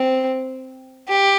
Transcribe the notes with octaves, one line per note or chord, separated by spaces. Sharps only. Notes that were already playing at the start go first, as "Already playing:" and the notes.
Already playing: C4
G4